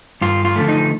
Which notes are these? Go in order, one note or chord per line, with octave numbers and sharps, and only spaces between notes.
G2 F4
F4
D3 F3 A3
D#4